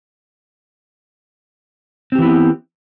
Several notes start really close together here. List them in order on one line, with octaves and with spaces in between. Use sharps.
C4 G4 E3 E4 B3